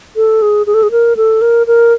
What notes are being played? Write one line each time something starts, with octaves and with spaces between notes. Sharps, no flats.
A4
G#4
G#4
A4
G#4
A#4
A4
A#4
A#4